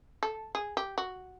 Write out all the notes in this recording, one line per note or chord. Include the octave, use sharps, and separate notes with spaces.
A4
G#4
G4
F#4